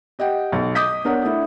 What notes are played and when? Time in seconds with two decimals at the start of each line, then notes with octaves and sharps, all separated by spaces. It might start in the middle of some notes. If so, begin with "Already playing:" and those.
0.19 G4 D#5 F#5 G5
0.52 B1
0.75 D#5 D6 D#6 G6 B6
1.05 B3 D4 A#4 C#5 F#5
1.23 A3 D4 E4